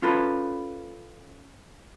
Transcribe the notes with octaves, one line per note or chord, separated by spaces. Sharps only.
C#4 F4 A4 B4